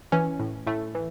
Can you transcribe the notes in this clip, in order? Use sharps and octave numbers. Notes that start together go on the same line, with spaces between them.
E3 C#4
A2
A2 A3
E3